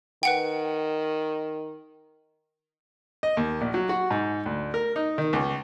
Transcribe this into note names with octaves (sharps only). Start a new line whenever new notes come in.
D#3 B4 F#5 G5
D#5
D#2
A#1
F#3
F#4
G#2
D2
A#4
D#4
D#3
C#2